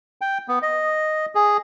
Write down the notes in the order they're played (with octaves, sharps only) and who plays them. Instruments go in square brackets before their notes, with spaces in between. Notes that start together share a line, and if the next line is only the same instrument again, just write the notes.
[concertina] G5
B3
D#5
G#4